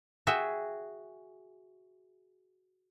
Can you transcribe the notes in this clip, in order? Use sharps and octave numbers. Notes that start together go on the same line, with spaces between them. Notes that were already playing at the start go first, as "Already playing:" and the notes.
F#4 G#4 E5 G5